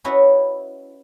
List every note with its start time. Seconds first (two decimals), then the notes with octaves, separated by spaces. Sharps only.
0.04 C#4 D#4 E4 F#4 B4 C#5